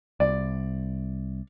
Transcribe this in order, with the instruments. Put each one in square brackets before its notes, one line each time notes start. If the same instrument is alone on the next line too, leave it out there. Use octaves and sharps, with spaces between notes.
[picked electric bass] C2 [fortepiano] D5